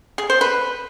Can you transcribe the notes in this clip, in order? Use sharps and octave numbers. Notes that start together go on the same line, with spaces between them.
G#4
C5
B4